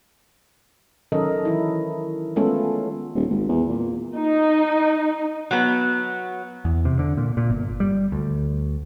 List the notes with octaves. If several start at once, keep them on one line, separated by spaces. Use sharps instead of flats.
D#3 F#3 C#4 A4 A#4 D#5
E3 E4
G#3 A3 B3 C#4 F4 A4
D#1
G#1
E2
A#2
D#4
F#3 B3
E2
C3
D3
A#2
A#2
G1
G3
D2